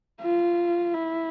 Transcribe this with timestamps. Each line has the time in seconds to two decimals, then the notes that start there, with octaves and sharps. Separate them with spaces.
0.22 F4
0.94 E4